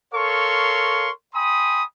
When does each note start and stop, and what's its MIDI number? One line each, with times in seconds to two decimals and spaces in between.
0.14 1.10 69
0.14 1.10 70
0.14 1.10 73
0.14 1.10 77
0.14 1.10 84
0.14 1.10 85
1.34 1.83 79
1.34 1.83 80
1.34 1.83 83
1.34 1.83 84
1.34 1.83 87